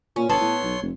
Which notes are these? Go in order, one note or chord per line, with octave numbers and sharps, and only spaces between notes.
A#2 C#4
G1 B3 A4 C#5 C6
A2
B1
F1